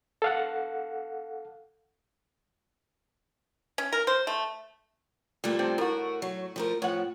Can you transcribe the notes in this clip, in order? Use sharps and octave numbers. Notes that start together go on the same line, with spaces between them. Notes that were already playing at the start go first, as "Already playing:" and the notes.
A4 F5 F#5
C#4
A#4
C5
A3
A#2 F3 G3 A3
C3 C4 D4
A2 F#4 A#4
F#3
F3 A3 A#4
F2 A2 F3 C#5 F#5